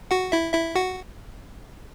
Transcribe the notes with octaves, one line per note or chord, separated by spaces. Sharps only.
F#4 F#5
E4 E5
E4 E5
F#4 F#5